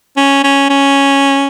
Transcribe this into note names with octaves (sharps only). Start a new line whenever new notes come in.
C#4
C#4
C#4